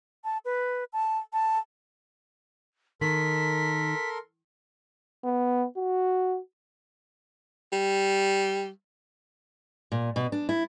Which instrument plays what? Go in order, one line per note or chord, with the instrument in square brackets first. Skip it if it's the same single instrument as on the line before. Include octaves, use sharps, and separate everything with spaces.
[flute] A5
B4
A5
A5
[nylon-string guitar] D#3 [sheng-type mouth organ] A4 A#4 C6 [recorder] B6
[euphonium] B3
F#4
[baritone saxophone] G3
[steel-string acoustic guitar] A#2
B2
D4
E4